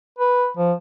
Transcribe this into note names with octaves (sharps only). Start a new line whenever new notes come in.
B4
F3